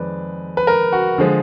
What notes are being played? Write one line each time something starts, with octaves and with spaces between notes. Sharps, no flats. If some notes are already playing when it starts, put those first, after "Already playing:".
Already playing: F2 D#3 G#3 B4 D5
B4
A#4
F#4
D3 F3 G#3